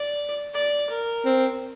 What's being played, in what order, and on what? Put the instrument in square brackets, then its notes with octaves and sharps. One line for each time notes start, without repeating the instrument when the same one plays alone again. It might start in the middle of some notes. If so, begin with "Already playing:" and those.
Already playing: [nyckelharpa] D5
D5
A#4
[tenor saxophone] C4